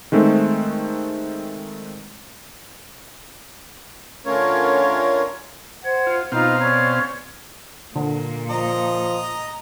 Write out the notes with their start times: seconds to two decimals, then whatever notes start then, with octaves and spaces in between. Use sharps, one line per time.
0.12 D#3 G#3 A3 C4
4.26 D3 A3 C#4 F4 A#4 C#5
5.83 C5 F#5 G#6
6.07 F4
6.32 B2 C4 D#4 F4 F5 A#5
6.60 C#4 C#5 D5
7.96 A#2 D3
8.50 F3 D#5 A#5